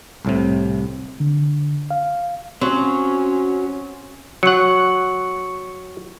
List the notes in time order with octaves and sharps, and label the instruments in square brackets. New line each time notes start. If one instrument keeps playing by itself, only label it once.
[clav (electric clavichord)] C2 A2 C3
[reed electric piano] D3
F5
[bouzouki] F#3 [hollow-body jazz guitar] C4 [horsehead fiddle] C#4
[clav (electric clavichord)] F#3 F#5 [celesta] C#6 C#7